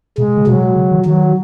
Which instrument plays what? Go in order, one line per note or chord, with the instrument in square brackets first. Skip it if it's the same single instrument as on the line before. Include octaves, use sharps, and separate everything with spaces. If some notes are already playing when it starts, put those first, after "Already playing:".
[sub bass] B2 [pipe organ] G#3
[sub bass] C#3
[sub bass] B2 [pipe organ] F#3
[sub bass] C#3
D#3
[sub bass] D#3 [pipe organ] F#3